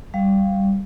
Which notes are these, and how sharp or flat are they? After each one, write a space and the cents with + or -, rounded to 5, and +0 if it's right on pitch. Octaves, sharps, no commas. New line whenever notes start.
G3 -5 F5 +0